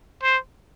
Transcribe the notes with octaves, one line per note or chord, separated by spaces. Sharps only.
C5